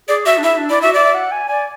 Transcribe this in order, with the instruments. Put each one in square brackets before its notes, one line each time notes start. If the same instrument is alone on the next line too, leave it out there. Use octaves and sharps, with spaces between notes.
[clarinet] G#4 [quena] D5
[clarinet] F#4 [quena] E5
[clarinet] D4
[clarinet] E4 [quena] E5
[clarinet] D4
[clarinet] E4 [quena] D5
[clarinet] F#4 [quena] E5
[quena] D5 [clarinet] E5
[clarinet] F#5
G#5
[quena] D5 [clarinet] G#5